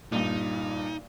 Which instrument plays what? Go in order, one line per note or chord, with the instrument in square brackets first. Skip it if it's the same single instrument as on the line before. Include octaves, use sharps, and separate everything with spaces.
[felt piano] G2 A#2 [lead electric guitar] D#4